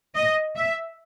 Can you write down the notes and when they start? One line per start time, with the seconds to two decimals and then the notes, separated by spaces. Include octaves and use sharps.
0.15 D#5
0.56 E5